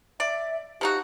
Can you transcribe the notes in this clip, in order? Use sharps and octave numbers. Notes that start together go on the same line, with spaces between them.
D5 E5
F3 D#4 F#4 G4